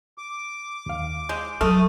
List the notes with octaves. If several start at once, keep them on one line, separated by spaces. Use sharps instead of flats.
D6
D#2 F5
G#3 G6
F#3 A3 A4 D#6 F6